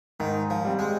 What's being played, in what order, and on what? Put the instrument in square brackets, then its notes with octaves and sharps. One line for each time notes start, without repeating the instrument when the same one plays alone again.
[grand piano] G#2 [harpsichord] D#3
[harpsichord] F3
[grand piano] G3 C4
[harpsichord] G#3